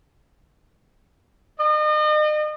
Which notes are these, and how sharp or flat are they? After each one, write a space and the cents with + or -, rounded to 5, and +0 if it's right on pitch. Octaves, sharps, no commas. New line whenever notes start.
D#5 -40